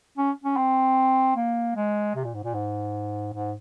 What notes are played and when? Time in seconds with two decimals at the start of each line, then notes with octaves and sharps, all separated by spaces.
0.18 C#4
0.44 C#4
0.57 C4
1.36 A#3
1.76 G#3
2.15 C3
2.24 A#2
2.34 G#2
2.44 A#2
2.54 G#2
3.34 G#2